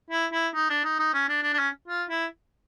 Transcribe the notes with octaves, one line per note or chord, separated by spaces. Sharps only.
E4
E4
D#4
D4
D#4
D#4
C#4
D4
D4
D4
C#4
F4
E4